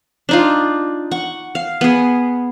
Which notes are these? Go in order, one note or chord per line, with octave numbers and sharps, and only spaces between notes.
D4 D#4 F4
F#5 C#6
F5
B3 G#4